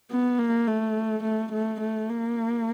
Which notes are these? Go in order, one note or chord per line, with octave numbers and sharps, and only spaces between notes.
B3
A#3
A3
A3
A3
A3
A#3